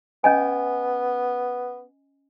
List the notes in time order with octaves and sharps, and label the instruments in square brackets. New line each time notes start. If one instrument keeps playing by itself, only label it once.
[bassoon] B3 [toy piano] C#4 D#5 G#5